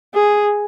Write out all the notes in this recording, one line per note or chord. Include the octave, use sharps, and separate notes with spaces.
G#4